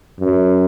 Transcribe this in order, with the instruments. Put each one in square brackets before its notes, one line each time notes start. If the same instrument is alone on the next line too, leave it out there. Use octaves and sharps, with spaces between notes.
[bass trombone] F#2